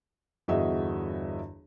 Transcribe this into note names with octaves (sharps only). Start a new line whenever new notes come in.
G1 E2 F#4 G#4 D#5 E5